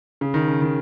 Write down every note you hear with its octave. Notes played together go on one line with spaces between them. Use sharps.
C#3
D#3
C#3
D#3